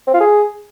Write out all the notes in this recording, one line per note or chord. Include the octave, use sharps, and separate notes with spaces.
C4
F4
G#4